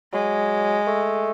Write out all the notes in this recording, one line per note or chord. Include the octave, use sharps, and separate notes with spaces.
F#3 G#3
A3